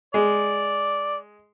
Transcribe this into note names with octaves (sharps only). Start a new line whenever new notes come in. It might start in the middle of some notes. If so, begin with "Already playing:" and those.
G#3 D5